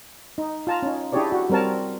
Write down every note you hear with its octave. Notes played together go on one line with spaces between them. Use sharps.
D#4
F4 A5 A#5
C#4 D#4
D4 E4 G4 G#4 C#5 D5
F#4
G3 C4 A#4 C#5 A5